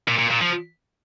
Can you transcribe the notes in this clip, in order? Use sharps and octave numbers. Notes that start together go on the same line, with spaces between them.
A#2
A#2
A#2
F3